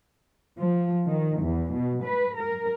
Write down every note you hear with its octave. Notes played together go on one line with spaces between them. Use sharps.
F3
D#3
E2
B2
B4
A#4